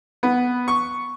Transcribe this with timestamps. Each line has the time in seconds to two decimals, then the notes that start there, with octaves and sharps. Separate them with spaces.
0.23 B3
0.68 C#6